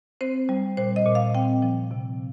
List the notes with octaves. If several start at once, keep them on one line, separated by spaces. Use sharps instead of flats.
C4 C5
G3
A#2 C5
D#5
A#2
F5
C4 G5
F3
C3